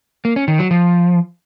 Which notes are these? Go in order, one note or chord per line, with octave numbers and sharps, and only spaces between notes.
A#3
C#4
D#3
F#3
F3